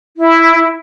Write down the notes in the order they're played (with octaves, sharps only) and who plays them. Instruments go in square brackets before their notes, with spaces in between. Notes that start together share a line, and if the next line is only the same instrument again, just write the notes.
[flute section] E4